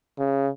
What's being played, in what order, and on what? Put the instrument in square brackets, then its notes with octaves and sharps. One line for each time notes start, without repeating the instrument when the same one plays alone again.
[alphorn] C#3